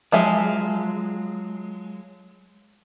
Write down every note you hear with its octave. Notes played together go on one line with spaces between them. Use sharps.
F3 F#3 G#3 E5 G#5